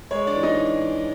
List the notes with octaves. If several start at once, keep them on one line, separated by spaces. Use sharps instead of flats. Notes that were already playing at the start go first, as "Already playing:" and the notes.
G#3 C#5
D4 D5
E3
D#4 D#5